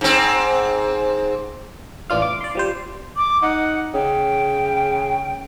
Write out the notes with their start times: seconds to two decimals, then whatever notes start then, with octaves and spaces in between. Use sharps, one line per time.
0.01 G#2 C4
2.10 A1 E3 D4 F4 F5
2.22 D6
2.41 D5 C6
2.55 F3 G3 C5
3.17 D6
3.42 D#4 F#5
3.94 C#3 G5